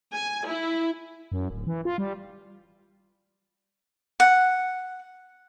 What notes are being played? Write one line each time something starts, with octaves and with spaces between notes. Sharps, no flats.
G#5
E4
F#2
D1
E3
F4
G3
F#5